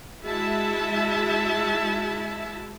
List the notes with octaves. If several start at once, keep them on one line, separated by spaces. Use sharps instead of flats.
G#3 E4 F#4 E5 A5